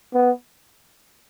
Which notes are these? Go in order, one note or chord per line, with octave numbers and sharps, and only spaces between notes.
B3